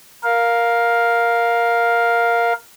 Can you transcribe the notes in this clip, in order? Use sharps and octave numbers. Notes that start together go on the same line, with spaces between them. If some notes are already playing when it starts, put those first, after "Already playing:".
A#4 F5